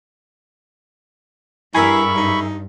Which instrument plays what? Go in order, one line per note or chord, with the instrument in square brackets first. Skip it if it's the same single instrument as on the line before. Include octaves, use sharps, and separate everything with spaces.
[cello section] G2 [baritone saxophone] E4 [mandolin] G#4 A#4 E5 [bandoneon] B5 C#6
[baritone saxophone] D#4